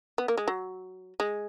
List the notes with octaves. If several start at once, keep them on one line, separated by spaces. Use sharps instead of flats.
B3
A#3
G#3
F#3
G#3